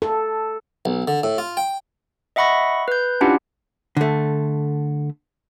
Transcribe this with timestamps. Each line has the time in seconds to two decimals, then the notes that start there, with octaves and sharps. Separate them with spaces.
0.02 A4
0.85 B1
1.08 D3
1.23 A2
1.38 F4
1.57 G5
2.36 D#5 E5 F#5 B5 C#6 A#6
2.88 B4 G6
3.21 C#4 D4 E4 F4 G4 F#5
3.97 D3 A3